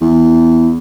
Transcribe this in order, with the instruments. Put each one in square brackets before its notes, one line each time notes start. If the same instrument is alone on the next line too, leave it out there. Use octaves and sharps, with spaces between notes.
[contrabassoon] E2